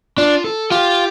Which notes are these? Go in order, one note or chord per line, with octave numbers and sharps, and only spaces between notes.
D4 F4
A4
F4 G4